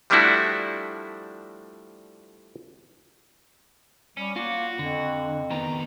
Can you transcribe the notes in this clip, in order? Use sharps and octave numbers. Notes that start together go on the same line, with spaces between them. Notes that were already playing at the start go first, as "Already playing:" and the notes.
F3 G3 A3 D4 E4 F#4
G3 C#4
A#3 F4 F#4
F2 D3
A2 D#3 B3 A#5